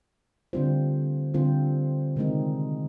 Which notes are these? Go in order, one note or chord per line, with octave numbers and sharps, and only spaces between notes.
D3 G3 C4 F4 C5
D3 G3 C4 F4 C5
C3 D#3 G#3 C4 D#4